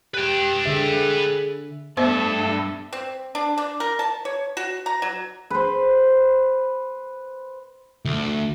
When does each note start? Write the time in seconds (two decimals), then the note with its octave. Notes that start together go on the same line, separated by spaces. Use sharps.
0.14 G4 B4 G5
0.66 D3 G#4 E5
1.97 G2 A3 B3 A4 C5 D#5 E5
2.93 C4
3.35 D4
3.58 D4
3.80 A#4
3.99 A5
4.25 C#5
4.57 F#4
4.86 A#5
5.02 F#3
5.50 B4 C5
8.05 D2